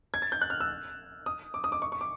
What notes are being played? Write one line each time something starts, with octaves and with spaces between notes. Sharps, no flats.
G#6
A6
G6
F#6
F6
E6
D#6
D6
D#6
D6
C#6
C#6
D6